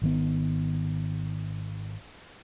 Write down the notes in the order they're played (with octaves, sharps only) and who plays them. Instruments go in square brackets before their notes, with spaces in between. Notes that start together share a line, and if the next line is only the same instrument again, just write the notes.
[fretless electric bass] G#1 D#3 B3